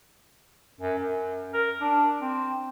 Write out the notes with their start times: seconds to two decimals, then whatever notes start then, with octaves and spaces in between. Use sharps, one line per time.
0.80 F#2
0.98 F#2
1.53 A#4
1.81 D4
2.21 C4